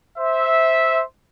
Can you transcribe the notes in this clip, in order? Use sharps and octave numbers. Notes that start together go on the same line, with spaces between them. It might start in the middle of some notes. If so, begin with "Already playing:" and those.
C5 E5